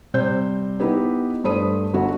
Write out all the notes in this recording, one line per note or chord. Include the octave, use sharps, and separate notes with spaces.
C3 G3 C5 G6
B3 D#4 E4 G4 B4
G2 A3 C5 B5 D#6 D#7
G1 F#4